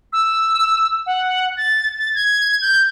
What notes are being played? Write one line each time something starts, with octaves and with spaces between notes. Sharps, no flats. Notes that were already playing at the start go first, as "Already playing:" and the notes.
E6
F#5
A6
A6
G#6
G6